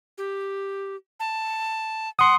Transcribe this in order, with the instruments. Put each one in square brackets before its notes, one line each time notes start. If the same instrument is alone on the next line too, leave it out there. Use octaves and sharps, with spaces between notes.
[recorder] G4
A5
[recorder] F#5 [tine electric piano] C6 D#6